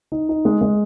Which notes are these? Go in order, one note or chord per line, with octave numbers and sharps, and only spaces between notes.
D#4
D#4
G#3
G#3